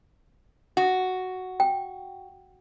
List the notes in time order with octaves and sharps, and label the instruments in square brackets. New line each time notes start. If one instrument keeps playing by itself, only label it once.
[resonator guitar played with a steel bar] F#4
[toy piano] G5